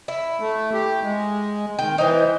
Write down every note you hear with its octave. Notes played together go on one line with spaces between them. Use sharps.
E4
A3
G4
G#3
D#3 G5
E3 D#4 C5